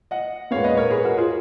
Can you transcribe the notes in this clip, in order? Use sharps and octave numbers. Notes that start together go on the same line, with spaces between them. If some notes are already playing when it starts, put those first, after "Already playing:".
D#5 F#5
A#2 G#3 B3 C#5 F5
B4 D#5
A#4 C#5
G#4 B4
F#4 A#4
F4 G#4